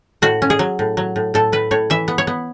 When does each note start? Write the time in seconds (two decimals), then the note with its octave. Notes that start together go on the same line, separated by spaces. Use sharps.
0.22 A2 F#4
0.42 C#4
0.50 G#4
0.59 F#3
0.79 A2
0.97 F#3
1.16 A2
1.34 A2 A4
1.52 A2 B4
1.71 A2 C#5
1.90 E3 E5
2.08 B3
2.18 C#5
2.27 B3